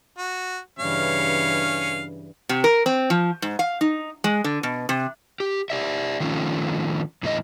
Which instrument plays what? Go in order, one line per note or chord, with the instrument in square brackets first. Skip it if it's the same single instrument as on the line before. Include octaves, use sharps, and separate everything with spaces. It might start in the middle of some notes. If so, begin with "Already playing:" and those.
[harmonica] F#4
[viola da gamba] G2 C#3 E3 [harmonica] C#4 F5
[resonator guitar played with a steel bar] C3
A#4
C4
F3
G#2
F5
D#4
G#3
D3
B2
C3
[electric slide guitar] G4
G4 D5 E5
D#3 F3 A3 C#4
E2 A2 E3 D#5